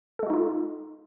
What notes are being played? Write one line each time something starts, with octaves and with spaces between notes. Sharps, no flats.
G#3 D#4 F4 F#4 A4